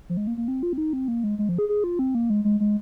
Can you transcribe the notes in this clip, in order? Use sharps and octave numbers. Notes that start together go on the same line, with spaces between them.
F3
G#3
A#3
A#3
C4
F4
C4
D#4
C4
A#3
G#3
G#3
F3
G#4
G#4
F4
C4
A#3
G#3
G#3
G#3